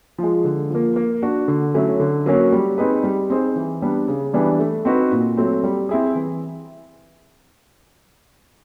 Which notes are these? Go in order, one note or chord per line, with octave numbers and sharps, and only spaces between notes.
F3 G#3
D3
F3 A#3
A#3
D4 F#4
D3
F#3 A3 C#4 E4
D3
F#3 A#3 C#4 F#4
G3
C4 D#4 G#4 B4
G3
C4 D#4 G#4 C5
E3
G3 B3 D4
C#3
E3 G3 B3 D4
A3
C4 D#4 F#4 B4
A#2
F#3 A3 C4
G3
C4 E4 G#4
E3